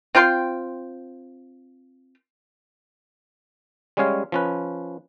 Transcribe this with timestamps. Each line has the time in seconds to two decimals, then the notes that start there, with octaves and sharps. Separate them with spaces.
0.15 C4 F4 G5 C6
3.97 G3 G#3 C#4 C#5 F5
4.32 F3 C#4 B4